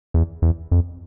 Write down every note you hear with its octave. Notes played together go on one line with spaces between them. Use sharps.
E2
E2
F2